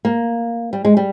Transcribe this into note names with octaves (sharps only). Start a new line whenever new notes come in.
A#3
G3
G#3
G3